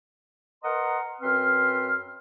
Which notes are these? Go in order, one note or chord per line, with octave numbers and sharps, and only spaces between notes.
A#4 B4 D#5 F#5 A#5 C6
F#2 C4 B4 C6 F6